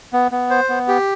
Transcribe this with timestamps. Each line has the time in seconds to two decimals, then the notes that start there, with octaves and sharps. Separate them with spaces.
0.13 B3
0.32 B3
0.50 C5
0.69 B3
0.88 G4